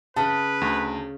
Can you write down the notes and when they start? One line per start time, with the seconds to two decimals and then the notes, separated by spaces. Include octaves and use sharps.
0.16 C#3 B4 A5
0.61 D2